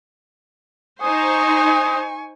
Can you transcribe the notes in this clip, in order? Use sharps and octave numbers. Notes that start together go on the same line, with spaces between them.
D#4 C5 G#5 C#6 D#6